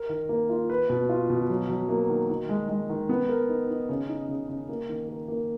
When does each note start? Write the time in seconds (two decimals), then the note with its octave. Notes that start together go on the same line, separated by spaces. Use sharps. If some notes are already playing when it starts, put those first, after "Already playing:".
Already playing: A#4
0.09 D#3
0.29 A#3
0.49 F4
0.70 B4
0.90 B2
1.09 F4
1.30 B2
1.50 F#3
1.69 F#3
1.89 A#3
2.09 D#3
2.29 D#3
2.49 G#3
2.69 G#3
2.89 D#3
3.09 B3
3.29 A#4
3.49 D#4
3.70 D#4
3.89 C#3
4.09 D#4
4.29 C#3
4.49 C#3
4.69 A#3
4.89 D#3
5.09 A#4
5.28 A#3